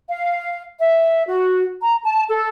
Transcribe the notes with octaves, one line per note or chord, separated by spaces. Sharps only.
F5
E5
F#4
A#5
A5
A4